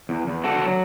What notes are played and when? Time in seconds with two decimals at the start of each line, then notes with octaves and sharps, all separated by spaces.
0.09 E2
0.27 E2
0.44 D3 F#4 A4
0.61 F#3